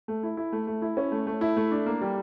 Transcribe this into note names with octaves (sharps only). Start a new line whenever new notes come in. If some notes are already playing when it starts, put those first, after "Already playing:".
A3
E4
E4
A3
A3
E4
C#4
A3
A3
E4
A3
D4
A#3
G3